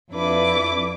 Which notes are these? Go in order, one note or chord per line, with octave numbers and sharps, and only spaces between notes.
F2 D4 E4 B4 D6